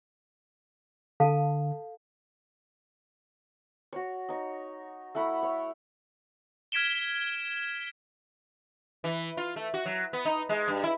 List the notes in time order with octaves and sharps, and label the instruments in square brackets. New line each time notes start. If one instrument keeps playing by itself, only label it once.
[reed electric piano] D3 [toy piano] A4 F5 A5
[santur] F#4 C#5
D#4 C#5
A3 E4 F#5 B5
C#5
[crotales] F6 G#6 B6 D7 E7 G7
[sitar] E3
F4
A3
F#4
F#3
B3
D#4
G#3
G2
E4